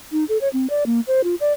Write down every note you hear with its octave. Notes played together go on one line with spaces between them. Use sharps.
D#4
A4
C#5
C4
D5
A#3
C5
F4
D5